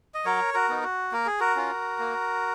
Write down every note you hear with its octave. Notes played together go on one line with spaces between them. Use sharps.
D#5
F#3 A#4 C#5
F#4 A#4
B3 D#4
F#4
A#3 A#4
G#4
F#4 A#4
C#4 F4
A#3